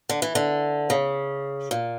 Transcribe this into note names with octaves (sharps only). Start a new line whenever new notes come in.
D3
E3
D3
C#3
A#2